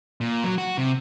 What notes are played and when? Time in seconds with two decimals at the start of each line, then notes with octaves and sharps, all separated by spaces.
0.21 A#2
0.44 F#3
0.58 F#4
0.78 C3